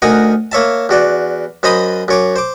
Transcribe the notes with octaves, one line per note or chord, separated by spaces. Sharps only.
D2 D#4 A#4 F#5 G#5
A#3 C#5 E5 A5
E2 F#4 D5
F#2 C5 D#5 B5 D#6
F#2 C#5 D6
C5 D6